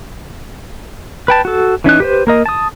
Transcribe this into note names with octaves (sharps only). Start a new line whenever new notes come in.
B4 G5 A5
F#4 A4
E3 C#4 D#4 F#6
G4 B4 C5
A#3 A#4 D#5
A5 D#6